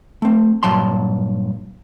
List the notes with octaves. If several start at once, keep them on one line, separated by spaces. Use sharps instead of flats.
A3 C4
G2 A#2 F#3 A5 C6